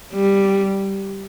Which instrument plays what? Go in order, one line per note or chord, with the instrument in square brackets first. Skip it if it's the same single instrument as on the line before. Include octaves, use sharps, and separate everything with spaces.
[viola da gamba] G3